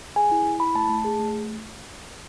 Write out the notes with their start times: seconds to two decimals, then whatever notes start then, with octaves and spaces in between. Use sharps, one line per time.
0.16 G#4 G#5
0.31 E4
0.46 E4
0.60 E4 B5
0.75 A3 A5
0.89 A3
1.05 G#4
1.19 A3